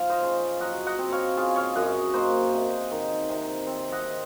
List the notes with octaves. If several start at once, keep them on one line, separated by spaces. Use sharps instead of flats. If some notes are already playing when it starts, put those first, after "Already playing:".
Already playing: F3 F5
C5 D#5
C#3
F#3 D#5 F#5
D#5 F#5
C4
C#5 F5
C#3 F4 G#4
C#5 F5
F#2 D#5 F#5
A#3 C5 D#5
C3
D#3
C3
C4
D#5 F#5